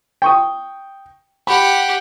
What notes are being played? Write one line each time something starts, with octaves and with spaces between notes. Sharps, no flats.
G5 C#6 D#6
G4 F#5 B5